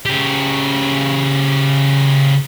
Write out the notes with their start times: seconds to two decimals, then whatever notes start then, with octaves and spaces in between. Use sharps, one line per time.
0.06 C#3 G4